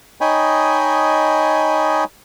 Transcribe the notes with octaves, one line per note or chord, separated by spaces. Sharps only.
D#4 C#5 D#5 G5 G#5 B5